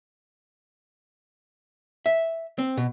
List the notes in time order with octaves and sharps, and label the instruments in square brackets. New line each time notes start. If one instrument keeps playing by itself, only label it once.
[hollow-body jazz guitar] E5
C4
B2